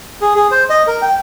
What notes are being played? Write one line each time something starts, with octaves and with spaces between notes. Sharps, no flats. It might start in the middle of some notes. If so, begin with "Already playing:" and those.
G#4
G#4
C5
D#5
A#4
G5